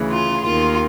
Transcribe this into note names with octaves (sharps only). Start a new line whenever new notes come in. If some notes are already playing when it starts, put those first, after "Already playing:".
Already playing: D2 C#3 E3
F4
D#2 D#3 F4